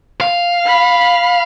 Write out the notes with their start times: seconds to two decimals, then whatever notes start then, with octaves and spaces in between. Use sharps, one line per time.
0.21 F5
0.66 B5